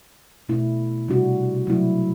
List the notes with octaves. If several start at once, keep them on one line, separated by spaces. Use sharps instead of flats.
B2 A3 E4
C3 G3 D4 F#4
F#3 A3 E4